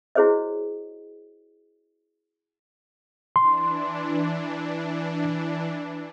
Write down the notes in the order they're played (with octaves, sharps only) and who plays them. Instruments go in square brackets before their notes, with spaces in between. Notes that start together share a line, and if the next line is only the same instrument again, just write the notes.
[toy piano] E4 F#4 G#4 C5 C#5 D#5
[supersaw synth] E3 D4 [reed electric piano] C6